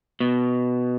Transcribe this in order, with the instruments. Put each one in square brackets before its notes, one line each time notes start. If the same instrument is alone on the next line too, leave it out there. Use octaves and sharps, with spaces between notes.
[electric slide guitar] B2